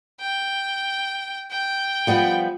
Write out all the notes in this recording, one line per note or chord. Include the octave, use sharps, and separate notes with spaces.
G5
G5
F3 G3 B3